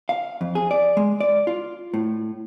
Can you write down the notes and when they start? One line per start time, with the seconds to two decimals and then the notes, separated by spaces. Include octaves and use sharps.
0.09 F5
0.41 F2
0.55 G#4
0.71 D5
0.97 G#3
1.20 D5
1.47 F4
1.94 A2